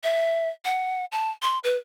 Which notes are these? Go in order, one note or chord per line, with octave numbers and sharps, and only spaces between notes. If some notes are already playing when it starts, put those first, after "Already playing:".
E5
F#5
A5
C6
B4